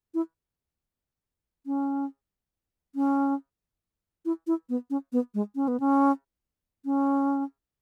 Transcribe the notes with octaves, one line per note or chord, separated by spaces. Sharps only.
E4
C#4
C#4
E4
E4
B3
C#4
B3
G#3
C#4
B3
C#4
C#4